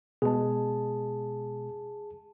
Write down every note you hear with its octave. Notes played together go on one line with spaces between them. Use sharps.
B2 G#3 G#4 A5